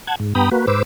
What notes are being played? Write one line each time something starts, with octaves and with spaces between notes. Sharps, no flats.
F#5 A5 G#6
G#2
G2 B3 G5 A#5 B5 D#6
A#3 F#4 B4
G#2 B4 C5 D6 E6